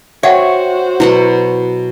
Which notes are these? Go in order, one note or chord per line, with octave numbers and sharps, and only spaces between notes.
F#4 C5 C#5 E5 F#5 G5
B2 F#3 E4 F#5